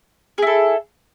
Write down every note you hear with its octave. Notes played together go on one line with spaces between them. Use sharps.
E4 G#4 A4